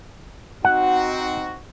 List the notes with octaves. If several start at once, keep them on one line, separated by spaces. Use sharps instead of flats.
C4 D#4 F#4 F#5